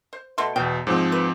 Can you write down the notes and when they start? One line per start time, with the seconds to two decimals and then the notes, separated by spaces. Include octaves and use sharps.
0.13 C5
0.38 B2 A3 C6
0.56 E2 B2 G5
0.87 G#2 F3 C4
1.12 B4